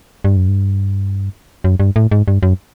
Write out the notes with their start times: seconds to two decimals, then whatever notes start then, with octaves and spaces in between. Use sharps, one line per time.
0.25 G2
0.36 F#2
0.48 G2
1.64 F#2
1.80 G2
1.96 A2
2.11 G#2
2.28 G2
2.43 F#2